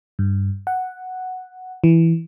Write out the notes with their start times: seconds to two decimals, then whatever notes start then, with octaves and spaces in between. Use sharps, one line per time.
0.19 G2
0.67 F#5
1.84 E3